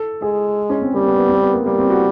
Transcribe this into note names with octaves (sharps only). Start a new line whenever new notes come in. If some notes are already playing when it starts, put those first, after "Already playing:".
Already playing: A4
G#3 G#4
C#4
C4
G3 A#3
B3
B3
C4
B3
A#3
G3 A#3
C4
F#4